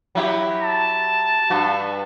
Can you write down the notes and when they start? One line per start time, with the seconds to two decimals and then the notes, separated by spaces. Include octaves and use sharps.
0.15 F#3 E4 G4
0.63 A5
1.50 G2 F#4